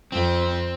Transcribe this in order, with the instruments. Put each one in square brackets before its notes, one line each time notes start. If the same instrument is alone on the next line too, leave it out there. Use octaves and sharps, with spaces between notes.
[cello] F2 [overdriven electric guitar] C4